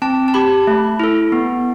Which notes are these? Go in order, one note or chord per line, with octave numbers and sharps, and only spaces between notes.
C4 A5
A5
G4 B5
A3
E4 A4
B3